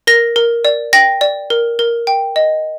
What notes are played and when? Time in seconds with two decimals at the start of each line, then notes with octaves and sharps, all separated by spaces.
0.07 A#4 A#6
0.36 A#4
0.65 D5
0.93 G5 A#6
1.21 D5
1.50 A#4
1.79 A#4
2.07 G5
2.36 D#5